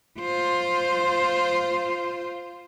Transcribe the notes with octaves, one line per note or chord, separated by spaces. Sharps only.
F4 C5